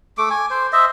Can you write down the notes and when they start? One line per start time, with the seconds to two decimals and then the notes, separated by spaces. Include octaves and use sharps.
0.18 A3 D6
0.30 G#5
0.50 C5
0.73 C5 D#5 E5